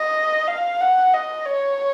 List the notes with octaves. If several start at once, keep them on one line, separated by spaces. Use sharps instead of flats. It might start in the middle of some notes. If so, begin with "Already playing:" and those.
Already playing: D#5
F5
F#5
D#5
C#5